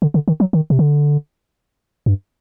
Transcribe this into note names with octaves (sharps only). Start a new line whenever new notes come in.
D3
D3
D#3
F#3
D#3
C3
D3
G2